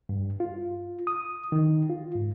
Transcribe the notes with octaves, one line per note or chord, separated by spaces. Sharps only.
G2
F4
D#6
D#3
F4
G#2